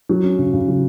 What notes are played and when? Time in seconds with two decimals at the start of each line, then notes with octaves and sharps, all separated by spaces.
0.09 F#3
0.24 C#4
0.39 C#3
0.53 C#3
0.68 F#3